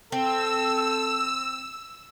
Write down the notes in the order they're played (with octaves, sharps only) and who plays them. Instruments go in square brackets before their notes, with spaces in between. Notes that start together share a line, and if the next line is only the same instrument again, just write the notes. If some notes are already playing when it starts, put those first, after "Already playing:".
[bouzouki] C4 [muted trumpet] A4 [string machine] E6